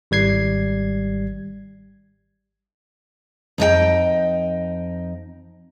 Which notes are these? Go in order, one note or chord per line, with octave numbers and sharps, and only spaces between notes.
G#1 G3 G#6 C7
F2 D#4 G#4 G5